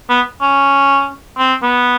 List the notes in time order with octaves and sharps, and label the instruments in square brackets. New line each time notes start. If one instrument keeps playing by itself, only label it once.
[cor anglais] B3
C#4
C4
B3